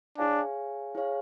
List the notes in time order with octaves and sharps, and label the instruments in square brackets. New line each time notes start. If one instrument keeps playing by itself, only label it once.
[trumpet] D4 [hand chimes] E4 G#4 C#5 F5 G#5
[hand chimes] E4 G#4 C#5 F5 G#5